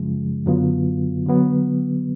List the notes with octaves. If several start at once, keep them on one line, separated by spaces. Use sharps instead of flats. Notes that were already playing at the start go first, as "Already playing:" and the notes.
Already playing: F#2 C#3 F3 G#3
F#2 D3 F#3 B3 F4
D3 F#3 B3